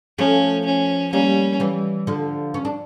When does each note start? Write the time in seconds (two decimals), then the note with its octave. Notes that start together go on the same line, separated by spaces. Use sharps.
0.18 F3 A3 C#4
0.65 C#4
1.13 G3 A#3 C#4
1.60 E3 G3
2.07 D3 F3
2.54 C#4
2.65 D4